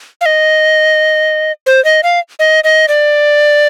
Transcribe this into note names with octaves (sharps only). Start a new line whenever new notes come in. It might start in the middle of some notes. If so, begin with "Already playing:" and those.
F5
D#5
C5
D#5
F5
D#5
D#5
D5